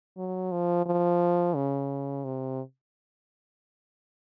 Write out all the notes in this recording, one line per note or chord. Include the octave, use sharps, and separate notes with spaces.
F#3
F3
F3
C#3
C3